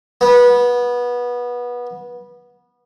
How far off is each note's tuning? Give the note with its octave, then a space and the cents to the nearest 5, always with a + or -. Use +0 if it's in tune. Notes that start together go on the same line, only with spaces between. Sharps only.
B3 -20